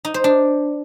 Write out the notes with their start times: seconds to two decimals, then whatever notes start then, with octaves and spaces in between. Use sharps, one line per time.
0.05 D#4
0.14 C5
0.24 D4